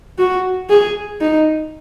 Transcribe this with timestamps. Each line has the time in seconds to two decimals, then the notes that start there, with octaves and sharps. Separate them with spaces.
0.19 F#4
0.70 G#4
1.21 D#4